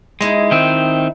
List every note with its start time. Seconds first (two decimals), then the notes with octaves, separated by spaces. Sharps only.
0.21 G#3 D#4 E4 E5
0.51 D#3 C4